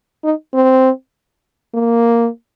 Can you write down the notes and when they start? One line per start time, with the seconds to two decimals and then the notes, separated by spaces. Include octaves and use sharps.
0.24 D#4
0.54 C4
1.74 A#3